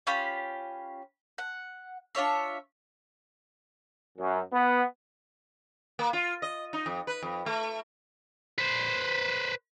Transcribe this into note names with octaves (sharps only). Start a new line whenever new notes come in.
C#4 F4 G4 B5
F#5
D4 F4 C#5 E5
F#2
B3
A#3
F4
D#5
D#4
F2
B4
F2
A3
B4 C5